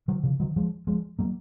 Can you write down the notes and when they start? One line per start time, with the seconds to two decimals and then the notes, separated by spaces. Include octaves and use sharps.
0.08 D#3 F#3
0.23 C#3 F3
0.40 D#3 F#3
0.56 F3 G#3
0.87 F3 G#3
1.19 F#3 A#3